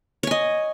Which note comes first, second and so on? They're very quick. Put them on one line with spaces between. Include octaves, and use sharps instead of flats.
C#5 G#5 D#5